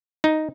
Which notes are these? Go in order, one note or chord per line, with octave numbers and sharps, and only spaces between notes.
D#4